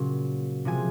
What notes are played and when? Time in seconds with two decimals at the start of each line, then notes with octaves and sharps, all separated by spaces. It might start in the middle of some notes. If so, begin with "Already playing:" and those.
Already playing: A#2 C#3 F#3
0.65 C3 F3 G#3 G#5